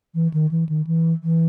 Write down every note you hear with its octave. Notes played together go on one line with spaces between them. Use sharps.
E3
D#3
E3
D#3
E3
E3